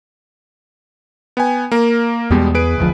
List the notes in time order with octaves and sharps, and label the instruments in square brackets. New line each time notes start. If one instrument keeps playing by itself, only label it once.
[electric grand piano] B3 G5 G#5
A#3 A#4
[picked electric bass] E2 B3 [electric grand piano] B2 G3 G#3
[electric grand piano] G#4 B4 D7
[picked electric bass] F1 D2 F3